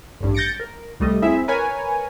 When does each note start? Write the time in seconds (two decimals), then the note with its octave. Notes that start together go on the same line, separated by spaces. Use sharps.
0.21 A1 G2
0.34 G6 A6 A#6 C#7 D7
0.60 A#4
1.00 C2 G3 A3 D#5
1.22 C4 E4 G#4 E5
1.48 A#4 B4 C#5 G#5